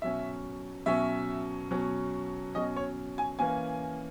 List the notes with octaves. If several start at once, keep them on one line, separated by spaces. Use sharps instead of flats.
B2 F#3 C#4 E5
B2 F#3 C#4 E5
B2 F#3 C#4
B2 F#3 C#4 D#5
C#5
G#5
E3 A#3 C#4 G#5